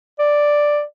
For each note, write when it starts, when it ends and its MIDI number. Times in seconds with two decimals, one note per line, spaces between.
0.19 0.82 74